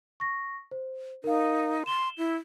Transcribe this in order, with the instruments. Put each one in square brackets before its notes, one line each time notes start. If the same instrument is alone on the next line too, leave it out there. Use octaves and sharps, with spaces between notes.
[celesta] C#6 A#6
C5
[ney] D#4 [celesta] A#4 F5
[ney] C6 [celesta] E7 G7
[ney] E4